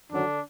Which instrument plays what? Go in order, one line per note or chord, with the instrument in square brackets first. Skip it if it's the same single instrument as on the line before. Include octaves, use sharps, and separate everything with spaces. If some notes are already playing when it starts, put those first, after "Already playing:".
[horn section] F#2 D3 D#3 F#3 D4